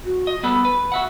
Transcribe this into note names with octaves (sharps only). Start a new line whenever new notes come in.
F#4
D#5
G3 B3 A4 B5
B4
F#4 E5 F#5